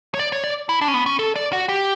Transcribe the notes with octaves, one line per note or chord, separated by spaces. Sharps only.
C#5
D5
C#5
D5
E4
D4
C#4
B3
C#4
A4
D5
F#4
G4